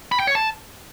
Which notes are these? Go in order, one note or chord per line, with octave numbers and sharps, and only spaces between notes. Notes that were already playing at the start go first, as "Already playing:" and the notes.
B5
G5
C#5
A5